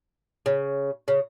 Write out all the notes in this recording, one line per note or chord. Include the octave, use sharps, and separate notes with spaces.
C#3
C#3